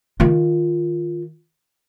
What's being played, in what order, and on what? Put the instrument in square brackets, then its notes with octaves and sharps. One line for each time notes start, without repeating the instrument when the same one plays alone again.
[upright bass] D#3 F4